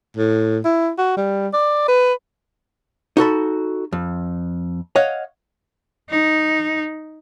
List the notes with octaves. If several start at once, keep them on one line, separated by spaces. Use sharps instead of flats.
A2
E4
F#4
G3
D5
B4
D#4 F#4 A4 B5
F2
C#5 D#5 F5 F#5
D#4